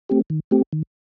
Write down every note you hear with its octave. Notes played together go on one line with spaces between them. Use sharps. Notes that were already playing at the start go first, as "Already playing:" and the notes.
A3 C4 G4
D#3
A3 C4 G4
D#3